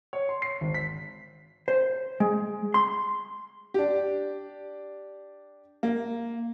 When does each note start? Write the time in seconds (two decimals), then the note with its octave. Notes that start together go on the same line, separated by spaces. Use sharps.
0.13 C#5
0.29 C6
0.42 C7
0.61 G#1
0.74 B6
1.68 C5
2.20 G#3
2.74 C6
3.74 D4 G4
5.83 A#3